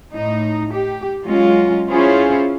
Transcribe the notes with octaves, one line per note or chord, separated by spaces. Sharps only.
A2 D#4
G4
F#3 G#3 C#4 F4
C#4 E4 F4 G#4 C5 C#5